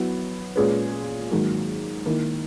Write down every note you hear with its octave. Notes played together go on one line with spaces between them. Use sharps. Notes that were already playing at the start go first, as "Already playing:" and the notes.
Already playing: F#3 B3 E4
A#2 G#3 C#4 G#4 B4
G#2 D#3 F#3 A#3
D#3 A#3 E4 A#4